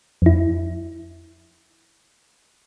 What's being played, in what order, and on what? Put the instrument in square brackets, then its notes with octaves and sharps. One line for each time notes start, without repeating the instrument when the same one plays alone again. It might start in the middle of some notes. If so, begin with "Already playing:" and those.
[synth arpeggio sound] F2 E4